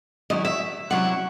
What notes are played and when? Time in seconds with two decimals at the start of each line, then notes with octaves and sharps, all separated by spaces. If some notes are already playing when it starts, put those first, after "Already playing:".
0.30 D#3 F#3 C#4 E4 D#5
0.45 E5
0.90 C3 F#3 C#4 E4 F#5